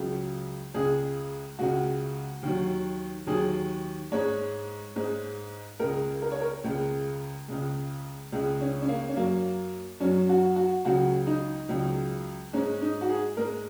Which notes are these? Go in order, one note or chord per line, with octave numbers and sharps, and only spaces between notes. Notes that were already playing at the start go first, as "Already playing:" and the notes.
Already playing: C#2 C#3 F#3
C#2 C#3 G#3 G#4
C#2 C#3 G#3 F#4
D#2 D#3 F#3
D#2 D#3 F#3 G#4
G#2 G#3 C#5
G#2 G#3
C#2 C#3 G#3 A#4
A#4
C#5
A#4
C#2 C#3 G#3
C#2 C#3 G#3
C#2 C#3 G#3
C#4
C#4
A#3
C#4
F#2 F#3 A#3
F#2 F#3 C#4
F#4
F#4
C#2 C#3 F#3 F#4
D#4
C#2 C#3 F#3
G#2 G#3 C#4
D#4
F#4
G#4
G#2 G#3 A#4